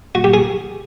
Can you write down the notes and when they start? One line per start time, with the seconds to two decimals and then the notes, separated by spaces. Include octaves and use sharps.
0.15 F#4
0.24 G4
0.34 G#4